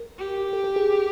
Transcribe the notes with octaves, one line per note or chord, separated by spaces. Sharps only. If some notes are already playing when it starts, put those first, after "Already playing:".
Already playing: A#4
G4
A4
A4
G#4